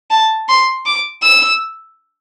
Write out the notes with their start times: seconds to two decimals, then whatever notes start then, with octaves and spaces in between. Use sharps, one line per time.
0.11 A5
0.49 C6
0.86 D6
1.23 E6